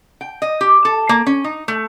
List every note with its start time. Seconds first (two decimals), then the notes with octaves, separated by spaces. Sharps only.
0.21 G5
0.42 D#5
0.61 G4
0.85 A4
1.09 A#3
1.27 C#4
1.44 D#4
1.68 A3